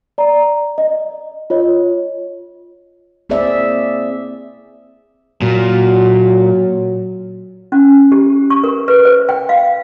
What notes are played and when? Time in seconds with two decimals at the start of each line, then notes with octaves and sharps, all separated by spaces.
0.18 D5 A#5
0.78 D#5
1.50 F4 C#5 D#5
3.30 A#3 C4 G#4 C5 D5 E5
5.42 A#2 F#3
7.72 C#4
8.12 G4
8.50 C#6
8.64 A#4
8.88 B4
9.05 C5
9.29 G5
9.49 F5